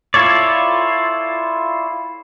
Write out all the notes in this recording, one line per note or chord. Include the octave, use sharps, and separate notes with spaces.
E4 F4 A4 C#5 D5